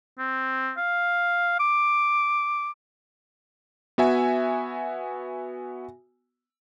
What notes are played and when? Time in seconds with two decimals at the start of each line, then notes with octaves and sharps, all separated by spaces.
0.19 C4
0.77 F5
1.60 D6
3.98 B3 F#4 E5 G#5